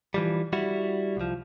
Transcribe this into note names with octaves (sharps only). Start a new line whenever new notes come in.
E3 F3 G3
G3 E4 F#4
C2 F3